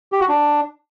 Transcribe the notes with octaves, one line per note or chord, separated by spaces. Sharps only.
G4
F#4
D4